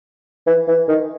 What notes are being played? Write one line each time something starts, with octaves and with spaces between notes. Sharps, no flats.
E3
E3
D#3